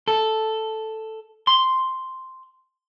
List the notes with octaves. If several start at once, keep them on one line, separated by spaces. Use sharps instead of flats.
A4
C6